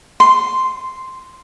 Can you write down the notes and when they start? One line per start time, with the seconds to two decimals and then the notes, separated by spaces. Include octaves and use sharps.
0.20 C6